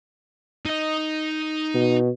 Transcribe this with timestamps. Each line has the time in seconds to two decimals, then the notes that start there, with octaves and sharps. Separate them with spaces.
0.65 D#4 D#5
1.74 B2